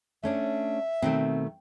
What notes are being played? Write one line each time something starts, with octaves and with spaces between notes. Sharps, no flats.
A3 C#4 D4 E5
B2 D#3 A3 C4